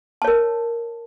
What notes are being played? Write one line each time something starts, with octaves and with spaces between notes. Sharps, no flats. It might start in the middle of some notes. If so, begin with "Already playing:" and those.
A#4 C#5 A5